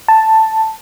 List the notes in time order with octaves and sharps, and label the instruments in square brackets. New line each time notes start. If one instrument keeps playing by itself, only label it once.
[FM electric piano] A5